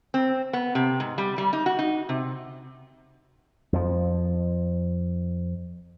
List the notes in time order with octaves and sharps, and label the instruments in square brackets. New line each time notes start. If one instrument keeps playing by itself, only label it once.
[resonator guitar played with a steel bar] C4
B3
C3
G#2
G3
G3
D#4
F#4
D#4
C3
[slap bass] F2 F3